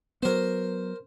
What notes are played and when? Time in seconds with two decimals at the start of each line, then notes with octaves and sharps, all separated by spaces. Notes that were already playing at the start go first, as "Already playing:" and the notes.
0.22 F#3 B3 A#4 C5